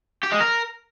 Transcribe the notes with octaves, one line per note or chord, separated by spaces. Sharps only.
G4
G#3
A#4